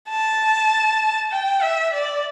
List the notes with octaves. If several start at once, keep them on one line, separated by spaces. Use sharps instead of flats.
A5
G5
E5
D5